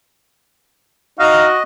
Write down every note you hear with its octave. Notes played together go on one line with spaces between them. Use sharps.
D#4 F#4 D#5 F5